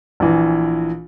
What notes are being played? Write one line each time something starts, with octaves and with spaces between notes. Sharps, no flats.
A#1 E3